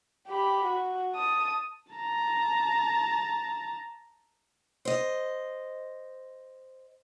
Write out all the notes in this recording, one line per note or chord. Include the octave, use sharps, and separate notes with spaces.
G4 B5
F#4
A5 D#6
A5 A#5
C5 D#5